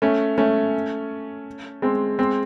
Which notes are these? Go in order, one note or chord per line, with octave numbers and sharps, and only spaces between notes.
A3 C#4
A3 C#4
G#3 C4
G#3 C4